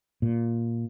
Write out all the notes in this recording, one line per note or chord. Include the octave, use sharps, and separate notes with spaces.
A#2